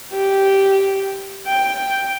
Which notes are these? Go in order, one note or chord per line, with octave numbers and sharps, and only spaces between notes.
G4
G5